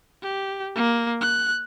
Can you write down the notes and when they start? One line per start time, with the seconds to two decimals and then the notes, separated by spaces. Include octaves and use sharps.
0.23 G4
0.76 A#3
1.21 F#6